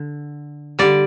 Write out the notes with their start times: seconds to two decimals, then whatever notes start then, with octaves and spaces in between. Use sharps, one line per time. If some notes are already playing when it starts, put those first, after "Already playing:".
Already playing: D3
0.79 D3 G3 D5